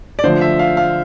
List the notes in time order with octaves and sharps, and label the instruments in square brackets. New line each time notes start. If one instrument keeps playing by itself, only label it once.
[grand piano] D5
[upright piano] D3 F3 A3 [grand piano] C5
[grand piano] E5
F5
F5